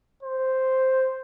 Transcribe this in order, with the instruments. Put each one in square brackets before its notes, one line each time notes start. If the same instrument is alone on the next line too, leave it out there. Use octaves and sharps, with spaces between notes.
[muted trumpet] C5